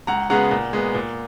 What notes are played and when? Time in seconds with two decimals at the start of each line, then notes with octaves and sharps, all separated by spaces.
0.07 C#2 F#5 A#5
0.30 C#3 G#3 B3 F#5 A#5
0.51 A#2
0.73 G#3 B3
0.95 A#2